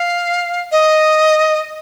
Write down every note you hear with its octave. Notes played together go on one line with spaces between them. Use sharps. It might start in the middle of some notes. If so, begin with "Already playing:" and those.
Already playing: F5
D#5